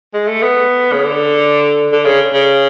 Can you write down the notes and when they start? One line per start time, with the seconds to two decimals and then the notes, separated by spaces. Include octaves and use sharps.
0.14 G#3
0.28 A3
0.43 B3
0.92 C#3
1.03 D3
1.92 D3
2.05 C#3
2.33 C#3